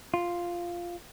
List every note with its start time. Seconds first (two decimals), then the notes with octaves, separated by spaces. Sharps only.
0.14 F4